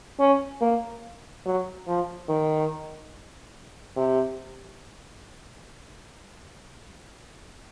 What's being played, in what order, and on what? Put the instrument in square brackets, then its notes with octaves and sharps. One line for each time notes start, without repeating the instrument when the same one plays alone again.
[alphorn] C#4
A#3
F#3
F3
D#3
C3